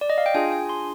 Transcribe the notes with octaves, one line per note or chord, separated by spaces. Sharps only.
D5
D#5
F5
G5
D4 F4 G#4 G#5
G#5
C6